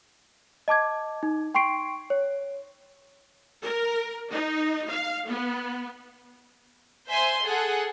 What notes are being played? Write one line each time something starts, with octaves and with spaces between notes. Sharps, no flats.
D#5 A5 D6 G#6
D#4
G5 C6 C#6 C7 D7
C#5
A#4
D#4
F5
B3
C5 E5 G#5 C6
G#4 A4 F#5